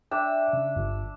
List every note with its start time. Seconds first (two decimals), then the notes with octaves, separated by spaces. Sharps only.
0.11 D4 E5 G5
0.53 C#3
0.76 G1